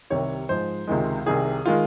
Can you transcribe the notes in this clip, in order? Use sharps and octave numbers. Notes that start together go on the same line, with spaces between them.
C2 C3 D#3 G3 C#5
G#2 F3 G#3 C5
C#2 C3 D#3 G#3
C2 C3 D#3 G#4
D#3 G#3 F4